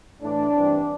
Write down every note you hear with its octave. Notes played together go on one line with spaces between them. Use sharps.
A2 E3 A3 D4
G2 E3 C4